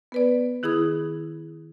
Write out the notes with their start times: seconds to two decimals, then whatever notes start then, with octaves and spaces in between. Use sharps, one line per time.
0.12 B3 B4 D5
0.63 D#3 E4 G#4 B5 D#6